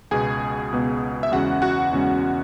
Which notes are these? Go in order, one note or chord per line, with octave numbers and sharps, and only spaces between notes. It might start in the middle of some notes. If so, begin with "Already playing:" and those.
C#2 B2 B3 G#4 G#5
C#2 B2 B3
E5
E2 C#3 G#3 C#4 F#4 F#5
F#4 F#5
E2 C#3 G#3 C#4